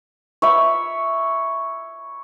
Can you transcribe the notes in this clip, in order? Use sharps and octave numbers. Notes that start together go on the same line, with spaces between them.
C#5 E5 B5